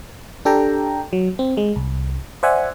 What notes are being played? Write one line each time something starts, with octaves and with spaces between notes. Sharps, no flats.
D4 G4 A4 G5 A#5
F#3
C4
G#3
C2
C5 D5 E5 F#5 G#5